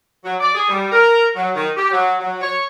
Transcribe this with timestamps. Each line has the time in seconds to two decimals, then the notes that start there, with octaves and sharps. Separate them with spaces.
0.23 F#3
0.40 D5
0.54 G#4
0.69 G3
0.91 A#4
1.36 F#3
1.55 D#3
1.77 G4
1.91 F#3
2.19 F#3
2.41 C#5